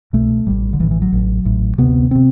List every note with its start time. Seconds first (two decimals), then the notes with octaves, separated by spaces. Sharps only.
0.13 C2 B2 A3
0.47 A1 A2 G3
0.73 D3
0.80 A1 A2 E3
0.91 E3
1.02 F#3
1.12 A1 A2
1.45 A1 A2
1.78 D2 C3 B3
2.11 C3 C4